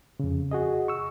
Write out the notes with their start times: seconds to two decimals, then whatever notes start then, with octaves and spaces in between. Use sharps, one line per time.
0.20 F2 C#3
0.51 F#4 G#4 D#5
0.88 C#6 E6